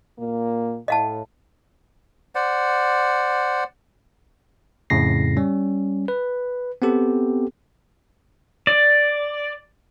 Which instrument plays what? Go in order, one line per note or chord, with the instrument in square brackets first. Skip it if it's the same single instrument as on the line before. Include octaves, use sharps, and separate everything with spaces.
[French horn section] A#2 A#3
[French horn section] A2 [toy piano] D#5 F5 A5
[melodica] C5 D5 F#5
[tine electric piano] F2 A2 C#3 A#6 C7
G3 C#4
B4
B3 C4 G4 A4
[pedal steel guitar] D5